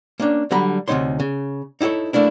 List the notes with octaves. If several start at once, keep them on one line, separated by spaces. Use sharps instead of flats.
A#3 C#4 D4
D3 F#3 G3 A#5 B5
D2 C3 F#3 D#4 C#5 C6
C#3
D#4 E4 G4 A4 C#5
A3 A#3 D4 E4